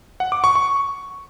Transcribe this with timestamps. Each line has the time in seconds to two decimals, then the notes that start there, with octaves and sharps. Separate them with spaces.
0.20 F#5
0.32 D6
0.44 C#6
0.55 C#6